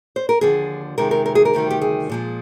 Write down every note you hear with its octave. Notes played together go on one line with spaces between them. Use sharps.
C5
A#4
D#2 D3 F3 G#4
F2 C3 D#3 G#3 A#4
A#4
A#4
G#4
A#4
D2 C3 D#3 G3
G4
G#4
A#2 F3 G#3